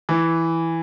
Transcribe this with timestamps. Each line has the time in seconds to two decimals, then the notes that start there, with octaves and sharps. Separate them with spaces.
0.09 E3